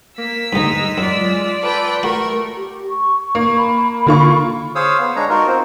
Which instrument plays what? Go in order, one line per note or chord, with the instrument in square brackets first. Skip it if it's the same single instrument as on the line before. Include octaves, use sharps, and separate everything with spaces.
[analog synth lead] A#3 [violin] E6 B6
[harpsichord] D2 G2 [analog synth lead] G#3 [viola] D#4
[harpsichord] F#2 [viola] F4 D5
[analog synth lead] A4 [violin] B4 G5
[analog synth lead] A3 [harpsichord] F#4 [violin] A#4 [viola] C#6
[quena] G4
C#6
[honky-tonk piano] A#3
[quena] B5
[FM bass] D3 [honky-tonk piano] A#3 F4 C#6
[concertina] G#4 C5 C#5 F5 D#6 E6
B3
G#3 D4 C#5 A#5
D#4 F4 F#4 A#4
C4 C5